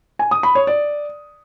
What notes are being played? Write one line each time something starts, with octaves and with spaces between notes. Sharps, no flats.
G#5
D#6
B5
C#5
D5